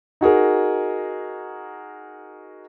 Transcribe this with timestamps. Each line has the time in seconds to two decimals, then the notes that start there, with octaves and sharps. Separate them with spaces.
0.21 D#4 F#4 G#4 A#4